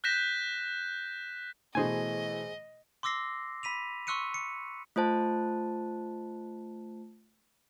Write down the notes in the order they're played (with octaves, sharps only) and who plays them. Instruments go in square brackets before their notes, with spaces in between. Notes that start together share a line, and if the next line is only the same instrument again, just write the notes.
[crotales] F#6 G6 A#6 B6 E7
[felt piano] B2 E3 A3 [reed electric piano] G#4 C5 G#5 [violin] D#5
[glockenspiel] C6 D6 E6 A#6 C7
B5 B6 D#7 F7
C6 C#6 E6 F#6 C#7 D#7
C#7
[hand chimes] A3 F4 C5 A5